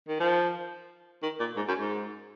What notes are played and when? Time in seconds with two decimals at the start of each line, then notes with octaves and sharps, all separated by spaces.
0.08 D#3
0.20 F3
1.23 D#3
1.40 A#2
1.56 G#2
1.68 F#2
1.79 G#2